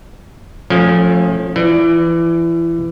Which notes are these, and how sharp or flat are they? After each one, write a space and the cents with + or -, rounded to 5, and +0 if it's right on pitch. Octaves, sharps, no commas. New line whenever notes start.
F3 +20 A3 +0 C#4 -20
E3 +25 D5 +0